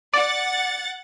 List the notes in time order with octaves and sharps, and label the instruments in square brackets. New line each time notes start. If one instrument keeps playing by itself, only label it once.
[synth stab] D5 [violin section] F#5 A6